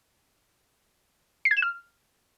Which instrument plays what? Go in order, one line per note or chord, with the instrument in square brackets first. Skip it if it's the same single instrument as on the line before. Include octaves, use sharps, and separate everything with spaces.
[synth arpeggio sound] C7
G#6
E7
F6